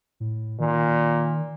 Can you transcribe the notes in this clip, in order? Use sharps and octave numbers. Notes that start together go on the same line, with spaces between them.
A2
A#2 D#3